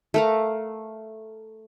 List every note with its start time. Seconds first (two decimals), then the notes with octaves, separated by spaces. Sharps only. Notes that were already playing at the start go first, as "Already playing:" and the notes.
0.14 A3 A#4 F5